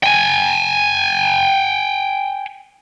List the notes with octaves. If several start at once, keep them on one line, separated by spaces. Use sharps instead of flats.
G5 G#5